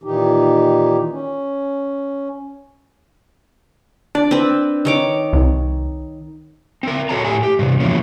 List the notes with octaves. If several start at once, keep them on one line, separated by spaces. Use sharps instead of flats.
A#2 D#3 E3 D#4 G4
C#4
D4 D5
C4 B4
D#3 C#5 D6
C2
C4 A#4
F#4 A4 C#5 A5 A#5
A2 G4 G#5
G4
G2 C3
B2 E3 F3 A#3 C#4